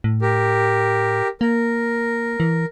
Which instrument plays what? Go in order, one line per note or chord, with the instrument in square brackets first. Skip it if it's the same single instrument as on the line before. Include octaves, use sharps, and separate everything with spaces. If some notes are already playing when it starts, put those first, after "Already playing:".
[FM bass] A2
[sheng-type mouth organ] G4 A#4
[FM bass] A#3 [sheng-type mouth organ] A#4
[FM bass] E3